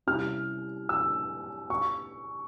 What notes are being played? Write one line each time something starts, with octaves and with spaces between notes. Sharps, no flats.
C3 G3 C#4 E4 F6
E6
C#6